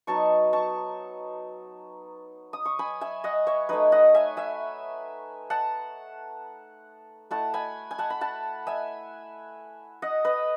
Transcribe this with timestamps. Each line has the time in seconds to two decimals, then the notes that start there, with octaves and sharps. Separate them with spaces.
0.07 F#3 B3 D#4 A5 C#6
0.53 A5 C#6
2.53 D#6
2.65 C#6
2.79 G#5 B5
3.01 E5 G#5
3.24 D#5 F#5
3.47 C#5 E5
3.69 A3 D#4 B4 D#5
3.92 D#5 F#5
4.14 E5 G#5
4.37 E5 G#5
5.50 F#5 A5
7.31 A3 E4 F#5 A5
7.54 G#5 B5
7.91 G#5
7.98 F#5 A5
8.10 B5
8.21 F#5 A5
8.67 E5 G#5
10.02 D#5 F#5
10.25 B4 D#5